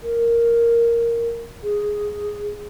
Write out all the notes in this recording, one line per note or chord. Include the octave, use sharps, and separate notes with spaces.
A#4
G#4